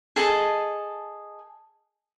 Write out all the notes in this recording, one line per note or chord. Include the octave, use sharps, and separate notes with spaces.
G#4 A4 D#5 A5